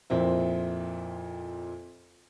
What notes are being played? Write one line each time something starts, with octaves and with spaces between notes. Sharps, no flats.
F2 A#2 C4 E4